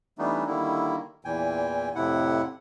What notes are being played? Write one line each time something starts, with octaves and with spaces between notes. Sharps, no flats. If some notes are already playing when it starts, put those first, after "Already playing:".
E3 G3 A3 B3 D4 D#4
D3 D#3 G3 A#3 E4
E2 A#2 E3 G5 G#5
F2 A2 C3 E4 F#5